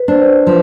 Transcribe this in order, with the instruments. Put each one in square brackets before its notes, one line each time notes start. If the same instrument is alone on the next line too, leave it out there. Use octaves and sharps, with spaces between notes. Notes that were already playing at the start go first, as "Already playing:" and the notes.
Already playing: [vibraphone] B4
[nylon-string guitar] D4 [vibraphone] C5
[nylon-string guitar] F3 [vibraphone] B4